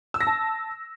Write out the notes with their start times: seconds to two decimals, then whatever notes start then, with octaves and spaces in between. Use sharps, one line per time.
0.14 E6
0.21 A#6
0.27 A5